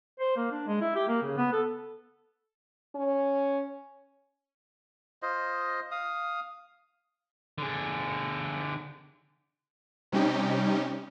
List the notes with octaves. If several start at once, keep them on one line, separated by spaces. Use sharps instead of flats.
C5
A#3
D4
G#3
E4
G4
A#3
C#3
B3
A4
C#4
F4 C5 D#5
F5 D#6
D3 G#4
C3 G3 C#4 D#4 G4